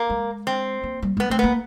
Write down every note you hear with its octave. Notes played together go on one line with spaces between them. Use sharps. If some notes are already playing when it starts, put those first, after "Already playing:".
Already playing: A#3
G#3
C4
A#3
G3
G#3 B3
A3 C4
A#3 B3